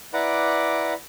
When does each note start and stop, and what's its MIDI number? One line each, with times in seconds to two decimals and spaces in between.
0.14 0.94 64
0.14 0.94 71
0.14 0.94 74
0.14 0.94 78
0.14 0.94 82
0.14 0.94 86